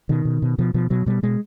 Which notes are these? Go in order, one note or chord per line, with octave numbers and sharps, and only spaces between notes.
B2 D#3
B2
B2
B2 F3
B2 F3
B2 F#3
B2 G3
B2 G#3